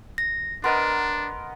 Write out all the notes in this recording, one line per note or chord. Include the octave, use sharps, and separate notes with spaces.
A#6
B3 D4 A#4 D#5 C6